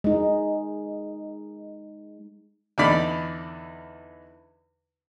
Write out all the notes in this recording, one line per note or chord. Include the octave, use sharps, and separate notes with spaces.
G#3 D#4
E2 D3 D#4 D5 B5